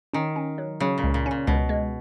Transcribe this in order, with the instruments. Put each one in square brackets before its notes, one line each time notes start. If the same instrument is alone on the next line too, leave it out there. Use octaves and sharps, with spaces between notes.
[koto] D#3 [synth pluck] C#4
[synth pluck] C#4
F#3
[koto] C#3 [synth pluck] F#3
[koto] A#2
[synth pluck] C#2
[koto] A#2
[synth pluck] C#4
[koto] A#2
[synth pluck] C#2 [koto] B2
[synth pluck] G#3